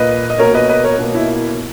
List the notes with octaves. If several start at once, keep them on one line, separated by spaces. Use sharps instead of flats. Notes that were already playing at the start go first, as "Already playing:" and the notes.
Already playing: A#2 A#3 B4 D#5
D#5
B2 A#3 A#4 C#5
B4 D#5
B4 D#5
A#4 C#5
B2 A#3
E4
E4